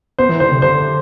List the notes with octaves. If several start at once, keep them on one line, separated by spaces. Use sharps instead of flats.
B3 C5
E3
D3 C5
C3
D3 C5